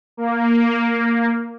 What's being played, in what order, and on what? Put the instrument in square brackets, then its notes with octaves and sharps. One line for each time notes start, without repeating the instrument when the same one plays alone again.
[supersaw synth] A#3